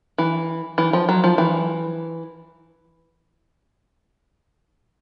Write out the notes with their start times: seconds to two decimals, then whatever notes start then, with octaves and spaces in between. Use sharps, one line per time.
0.18 E3
0.78 E3
0.93 F3
1.09 F#3
1.24 F3
1.38 E3